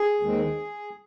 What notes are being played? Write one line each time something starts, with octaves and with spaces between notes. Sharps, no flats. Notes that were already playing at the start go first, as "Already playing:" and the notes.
Already playing: G#4
D#2 D#3 G#3 C4